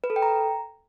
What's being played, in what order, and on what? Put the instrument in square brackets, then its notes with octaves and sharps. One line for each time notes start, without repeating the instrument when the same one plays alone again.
[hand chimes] B4
A4
G5
A#5